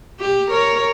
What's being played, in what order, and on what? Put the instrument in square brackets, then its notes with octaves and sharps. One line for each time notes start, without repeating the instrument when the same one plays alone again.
[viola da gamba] G4
A#4 C#5